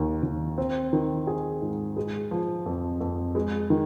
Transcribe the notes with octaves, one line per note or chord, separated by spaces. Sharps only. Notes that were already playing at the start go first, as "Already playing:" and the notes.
Already playing: D#2 D#3
D#2
C4
D#3
G#4
G#2
G#3
F3
F2
F2
G#3
D#3